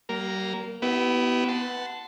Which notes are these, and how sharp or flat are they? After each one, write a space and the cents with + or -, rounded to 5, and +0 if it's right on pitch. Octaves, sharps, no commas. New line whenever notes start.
G3 -45 A#3 +0 A#4 +0
B3 +0 E4 -15 G4 -45
F#5 +0 A5 +0 C6 -25